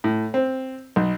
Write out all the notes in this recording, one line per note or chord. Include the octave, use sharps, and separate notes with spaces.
A2
C4
B1